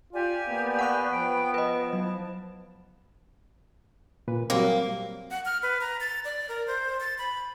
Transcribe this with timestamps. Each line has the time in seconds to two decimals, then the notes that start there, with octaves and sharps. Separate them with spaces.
0.13 F4 G4 D5 G#5
0.48 A#3 B3
0.79 F#5 C#6 F#6
1.11 F3 B4 G5
1.54 B4 D#5 A5
1.93 F#3
4.28 A#2 B4
4.50 F#3 G3 A#3 C4
5.31 F#5
5.46 F6
5.63 B4
5.81 A#5
6.01 A6
6.25 D5
6.49 A#4
6.67 C5
7.00 A6
7.18 B5